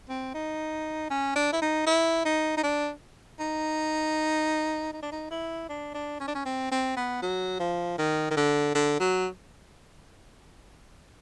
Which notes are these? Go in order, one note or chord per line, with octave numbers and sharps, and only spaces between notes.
C4
D#4
C#4
D4
E4
D#4
E4
D#4
D#4
D4
D#4
D#4
D4
D#4
E4
D4
D4
C#4
D4
C#4
C4
C4
B3
F#3
F3
D#3
D#3
D3
D3
F#3